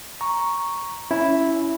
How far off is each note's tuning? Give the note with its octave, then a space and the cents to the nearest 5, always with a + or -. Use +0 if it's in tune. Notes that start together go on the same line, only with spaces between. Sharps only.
A#5 +0 C#6 +0
C#4 +15 E4 +0